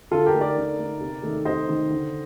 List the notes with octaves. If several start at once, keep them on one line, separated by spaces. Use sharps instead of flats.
D3 F4 A4
G4 A#4
A3 D#4
A#4 D5
D3
A3 D#4
C3
D#3 A3 D#4
C3 C5 D#5
D#3 A3 D#4
D3